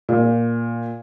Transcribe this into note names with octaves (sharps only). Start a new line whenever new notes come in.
A#2